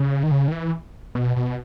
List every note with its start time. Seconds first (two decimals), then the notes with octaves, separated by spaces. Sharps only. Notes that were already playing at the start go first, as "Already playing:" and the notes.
Already playing: C#3
0.23 D#3
0.31 C#3
0.48 D#3
0.52 E3
1.15 B2
1.36 B2